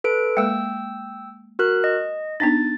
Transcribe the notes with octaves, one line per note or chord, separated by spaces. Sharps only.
A4 B4 D7
G#3 A#3 G5 E6
F#4 A#4 F#6
D#5
B3 D4 D#4 A6